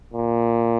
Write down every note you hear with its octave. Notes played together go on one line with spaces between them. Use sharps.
A#2